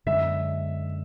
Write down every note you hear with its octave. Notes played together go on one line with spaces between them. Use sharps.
F#2 D3 G#3 D4 E5